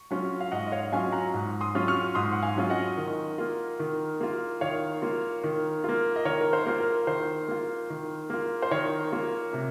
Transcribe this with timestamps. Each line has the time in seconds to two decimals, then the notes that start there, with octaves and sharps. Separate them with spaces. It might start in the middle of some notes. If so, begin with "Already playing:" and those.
Already playing: C#6
0.11 F#3 C#4 F4
0.40 F5
0.51 G#2 D#5 F#5
0.67 D#5
0.72 C#5 F5
0.92 F#3 C#4 F4 F5 G#5
1.12 F#5 A#5
1.34 G#2
1.61 C6 D#6
1.75 F#3 C#4 F4
1.88 C#6 F6
2.15 G#2 C6 D#6
2.33 F#5
2.42 F5 G#5
2.56 F#3 C#4 F4
2.70 D#5 F#5
2.97 D#3
3.38 A#3 F4
3.79 D#3
4.20 A#3 F4
4.61 D#3 C#5 F5
5.02 A#3 F4
5.43 D#3
5.84 A#3 F4
6.16 D#5
6.25 D#3 A#4 C#5
6.41 A#4
6.53 C5
6.66 A#3 F4
6.80 A#4
7.07 D#3 C5
7.48 A#3 F4
7.90 D#3
8.30 A#3 F4
8.62 C5
8.71 D#3 A#4 C#5
9.12 A#3 F4
9.53 C3